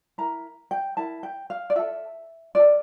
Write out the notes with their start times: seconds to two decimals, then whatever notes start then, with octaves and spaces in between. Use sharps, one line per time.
0.18 E4 A#4 A#5
0.71 G5
0.97 E4 A#4 A5
1.23 G5
1.50 F5
1.70 D5
1.76 F4 A4 E5
2.55 F4 A4 D5